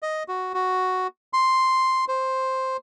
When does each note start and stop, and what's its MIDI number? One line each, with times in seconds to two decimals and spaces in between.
0.03 0.23 75
0.28 0.53 66
0.54 1.07 66
1.33 2.05 84
2.08 2.77 72